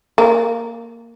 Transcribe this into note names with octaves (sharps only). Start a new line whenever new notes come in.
A#3